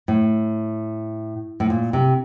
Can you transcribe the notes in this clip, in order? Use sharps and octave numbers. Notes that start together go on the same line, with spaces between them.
A2
A2
A#2
C3